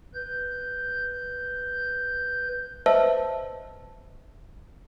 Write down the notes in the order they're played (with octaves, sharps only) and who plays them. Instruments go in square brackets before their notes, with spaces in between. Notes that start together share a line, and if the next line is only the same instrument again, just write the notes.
[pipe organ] B4 G6
[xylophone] B4 C5 D#5 E5 A5 E6